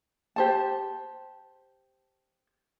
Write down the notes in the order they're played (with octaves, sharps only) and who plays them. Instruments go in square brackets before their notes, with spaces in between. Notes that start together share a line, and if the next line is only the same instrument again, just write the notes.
[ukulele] G4 C5 A5